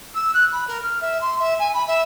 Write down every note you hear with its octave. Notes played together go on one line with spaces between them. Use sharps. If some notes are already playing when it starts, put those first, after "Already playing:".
E6
F#6
B5
A#4
F6
E5
C6
E5
G#5
B5
E5